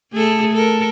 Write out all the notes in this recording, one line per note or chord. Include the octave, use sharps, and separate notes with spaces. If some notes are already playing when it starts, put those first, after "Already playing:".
A3 G#4 A4
A4 A#4